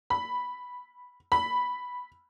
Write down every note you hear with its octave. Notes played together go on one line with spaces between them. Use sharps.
B5
B5